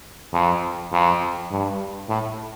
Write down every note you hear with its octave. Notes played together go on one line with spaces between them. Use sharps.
F2
F2
G2
A2